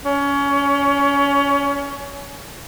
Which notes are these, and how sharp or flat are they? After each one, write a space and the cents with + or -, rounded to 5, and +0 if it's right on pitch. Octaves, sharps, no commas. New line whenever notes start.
C#4 +25